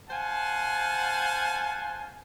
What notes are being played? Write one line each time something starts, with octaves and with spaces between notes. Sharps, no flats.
C5 F5 F#5 G#5 A5